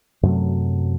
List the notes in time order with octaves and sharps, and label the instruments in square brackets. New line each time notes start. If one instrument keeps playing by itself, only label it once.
[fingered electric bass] F#2 C3 F#3 A3